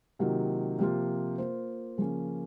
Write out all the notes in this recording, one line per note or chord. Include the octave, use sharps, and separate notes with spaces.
C3 D#3 F#3 A#3 F4
C3 F3 A#3 F4
A#3 F4 C5
C#3 F3 A#3 C#4